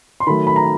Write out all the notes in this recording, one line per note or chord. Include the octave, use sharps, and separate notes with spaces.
C6
D#3 F#3 A3 B5
B5
A#5